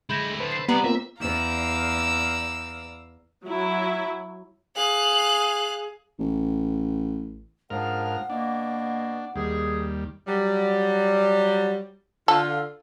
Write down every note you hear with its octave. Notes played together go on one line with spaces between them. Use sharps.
D3 G#3 E4 B5 G6 A#6
B4 C5 A5 B5
C7
C2 G3 B3 B4 D5 A#5
A#3 C4 F4 E5
E2 D5 F5 A#5 E6
F#3 E4
G#4 F5 F#6
A1
C#2 G#2 F3 D4 A#4 F#5 F6
B2 A#3 D4
D#2 G#2 G3 G#4
F#3 G3
D3 F4 A4